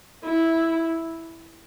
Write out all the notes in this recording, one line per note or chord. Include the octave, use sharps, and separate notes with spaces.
E4